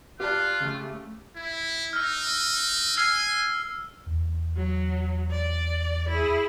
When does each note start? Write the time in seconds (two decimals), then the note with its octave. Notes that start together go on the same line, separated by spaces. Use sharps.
0.20 F4 G4 D5 A5 F#6
0.60 C#3 A3 G4
1.36 E4
1.93 D#4 E6 F6
2.97 G#5 E6 F6 C7
4.07 E2
4.56 F#3
5.31 D5
6.09 E4 G#4